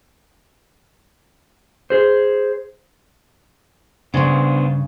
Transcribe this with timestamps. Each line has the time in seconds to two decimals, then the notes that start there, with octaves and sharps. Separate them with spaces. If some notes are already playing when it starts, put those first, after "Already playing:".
1.90 G#4 C5
4.14 G2 C#3 B3 D4 C5